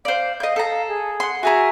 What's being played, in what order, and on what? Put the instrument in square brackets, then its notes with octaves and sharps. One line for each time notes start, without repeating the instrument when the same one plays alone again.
[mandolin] C5 D5 [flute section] F5
[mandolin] D#5 G6 [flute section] F5
[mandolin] A4 A#5
[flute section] G#4
[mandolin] F#5 C6
[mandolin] F#4 G#4 A#4 [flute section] E5 G#5